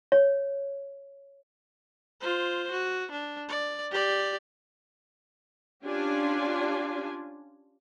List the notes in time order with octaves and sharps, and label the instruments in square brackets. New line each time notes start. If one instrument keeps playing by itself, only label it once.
[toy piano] C#5
[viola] F4 C5
F#4
D4
D5
G4 D5
[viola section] C#4 D4 F4 G4 G#5